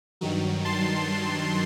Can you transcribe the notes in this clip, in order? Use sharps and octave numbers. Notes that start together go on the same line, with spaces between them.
G2 D#3 F#3
A5 C6